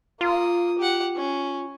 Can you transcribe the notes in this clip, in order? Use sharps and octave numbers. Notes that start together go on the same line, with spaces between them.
A#3 F4 D#6
G4 F#5
C#4